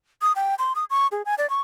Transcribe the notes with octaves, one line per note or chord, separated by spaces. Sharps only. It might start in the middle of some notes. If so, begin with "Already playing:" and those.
D#6
G5
C6
D#6
C#6
G#4
G#5
D5
C#6